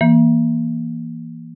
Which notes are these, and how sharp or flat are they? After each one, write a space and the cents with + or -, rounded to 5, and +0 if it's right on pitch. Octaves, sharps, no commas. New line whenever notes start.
E3 +0 A#3 +10